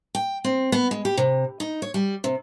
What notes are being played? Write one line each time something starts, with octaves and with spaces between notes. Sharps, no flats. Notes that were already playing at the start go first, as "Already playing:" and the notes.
G5
C4
B3
G#3
G4
C3
D#4
C#5
G3
C3